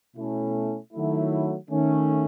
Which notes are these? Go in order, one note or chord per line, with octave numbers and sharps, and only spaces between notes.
B2 A3 C#4 E4
D#3 F#3 A3 E4
D#3 A3 C#4